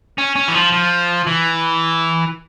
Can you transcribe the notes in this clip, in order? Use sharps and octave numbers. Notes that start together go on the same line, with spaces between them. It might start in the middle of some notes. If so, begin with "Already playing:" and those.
C#4
C#4
E3
F3
F3
E3